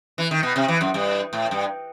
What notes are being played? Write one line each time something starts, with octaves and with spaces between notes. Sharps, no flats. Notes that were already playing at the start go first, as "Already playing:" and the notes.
E3
D#3
B2
C3
E3
F#2
G2
A2
G2